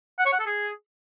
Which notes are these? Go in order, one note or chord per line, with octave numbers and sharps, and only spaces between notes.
F#5
C#5
F#5
A4
G#4